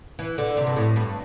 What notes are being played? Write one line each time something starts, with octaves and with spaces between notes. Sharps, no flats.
E3
D3
C3
G2
A2
G2